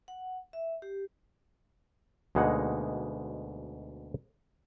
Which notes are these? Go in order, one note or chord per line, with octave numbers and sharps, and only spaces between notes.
F#5
E5
G4
D2 B2 G#3 A#3 D#4 F#5